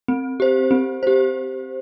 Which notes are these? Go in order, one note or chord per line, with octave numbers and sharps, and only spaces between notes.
C4
G4 C5
C4
G4 C5